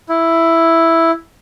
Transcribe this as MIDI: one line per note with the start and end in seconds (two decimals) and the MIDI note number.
0.09 1.11 64